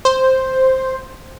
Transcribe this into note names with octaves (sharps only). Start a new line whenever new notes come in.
C5